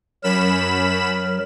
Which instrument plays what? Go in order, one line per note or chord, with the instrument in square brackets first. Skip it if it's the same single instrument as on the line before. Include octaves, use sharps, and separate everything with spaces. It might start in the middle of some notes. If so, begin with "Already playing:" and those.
[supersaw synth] F#2 B5 E7 [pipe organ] F#3 A#4